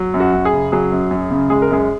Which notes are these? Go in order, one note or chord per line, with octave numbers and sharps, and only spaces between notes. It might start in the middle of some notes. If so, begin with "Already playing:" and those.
Already playing: F#3
F#2
F#4
F#2
G#4
C#3
F#3 G#4
F#2
F#2
C#3
G#3 G#4
A#4
F#2 G#4